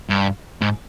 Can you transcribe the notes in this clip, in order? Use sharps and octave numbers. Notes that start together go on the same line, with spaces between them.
G2
G#2